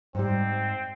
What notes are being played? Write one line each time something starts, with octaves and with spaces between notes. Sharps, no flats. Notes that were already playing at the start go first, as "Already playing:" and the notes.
G#2 G3 C4